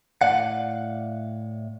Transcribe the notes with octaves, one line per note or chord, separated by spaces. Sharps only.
A2 D5 F5 F#5